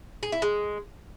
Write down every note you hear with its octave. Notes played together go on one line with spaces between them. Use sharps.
G#4
E4
G#3